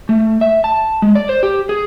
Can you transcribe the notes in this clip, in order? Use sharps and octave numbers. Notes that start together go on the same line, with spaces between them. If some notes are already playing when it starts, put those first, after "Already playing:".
A3
E5
A5
G#3
D5
C5
G4
G#4